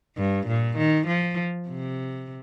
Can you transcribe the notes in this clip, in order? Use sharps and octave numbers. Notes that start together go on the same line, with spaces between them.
G2
A#2
D#3
F3
C3